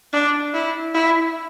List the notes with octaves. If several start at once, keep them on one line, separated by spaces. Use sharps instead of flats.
D4
E4
E4